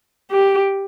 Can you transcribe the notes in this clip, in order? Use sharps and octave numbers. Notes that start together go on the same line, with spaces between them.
G4